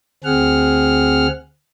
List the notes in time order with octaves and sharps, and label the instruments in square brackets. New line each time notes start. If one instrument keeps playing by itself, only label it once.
[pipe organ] D2 C4 G#4 F#5 F6